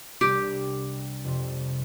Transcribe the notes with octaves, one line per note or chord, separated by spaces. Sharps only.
C2 C3 G3 D4 G4
F2 C3 G3 C4